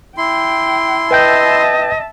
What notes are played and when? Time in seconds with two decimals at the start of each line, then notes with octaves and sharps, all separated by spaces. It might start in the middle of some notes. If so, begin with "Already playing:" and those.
0.17 E4 G5 C6
1.11 B4 D#5 E5 G5 A5 G6